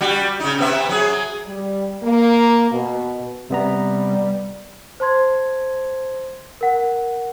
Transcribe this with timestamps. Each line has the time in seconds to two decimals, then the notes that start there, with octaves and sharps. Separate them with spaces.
0.01 G3 F#4
0.40 C#3 D#4
0.58 C3 B3 E5
0.89 F#3 G#4
1.46 G3
2.03 A#3
2.71 B2
3.50 C3 G3 B3 A#5
5.00 C5 A5 C6 G#6
6.61 A#4 F#5